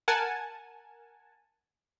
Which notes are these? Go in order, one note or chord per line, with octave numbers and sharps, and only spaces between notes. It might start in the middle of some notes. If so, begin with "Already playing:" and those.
A#4 F#5 G#5 A5